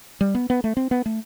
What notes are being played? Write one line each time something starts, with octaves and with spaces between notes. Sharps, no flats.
G3
B3
B3
A3
C4
B3
A3